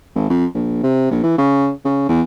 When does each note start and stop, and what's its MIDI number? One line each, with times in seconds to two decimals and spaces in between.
0.15 0.25 32
0.30 0.45 41
0.54 0.83 34
0.83 1.11 48
1.11 1.21 34
1.24 1.33 52
1.38 1.71 49
1.85 2.06 49
2.09 2.21 40